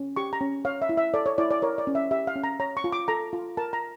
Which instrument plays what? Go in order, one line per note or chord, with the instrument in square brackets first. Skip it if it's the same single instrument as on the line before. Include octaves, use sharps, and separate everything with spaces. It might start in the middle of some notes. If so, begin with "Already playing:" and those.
Already playing: [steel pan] C#4
G4 C#6
A#5
C#4
C#5 F5
E5
E4
E5
A4 D5
C#5
E4 D5
D5
A#4 C#5
D5
C#4
E5
G4 E5
F5
C#4
A#5
C#5 A#5
C#6
F4
D6
A4 A#5
F4
A#4 A5
A#5